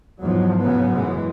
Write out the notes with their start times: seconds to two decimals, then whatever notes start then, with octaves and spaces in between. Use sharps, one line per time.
0.18 E2 G#2 F3 F#3
0.59 A2 C#3 F#3 B3
0.92 F#2 E3 G#3